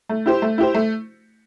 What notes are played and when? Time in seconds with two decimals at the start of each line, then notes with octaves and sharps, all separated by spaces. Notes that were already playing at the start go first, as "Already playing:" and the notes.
0.09 A3
0.26 E4 G4 C5
0.42 A3
0.58 E4 G4 C5
0.74 A3